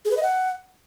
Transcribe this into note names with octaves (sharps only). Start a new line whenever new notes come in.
G#4
B4
D#5
F#5